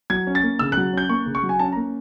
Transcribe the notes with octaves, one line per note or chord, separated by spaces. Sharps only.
F#3 G#6
C#4
A6
A#3
C#3 E6
F#6
F#3
C#4 G6
A#3 C#6
C#3
C#6
F#3
G#5
C#4 A5
A#5
A#3